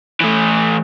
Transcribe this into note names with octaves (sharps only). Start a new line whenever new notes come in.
E3 A3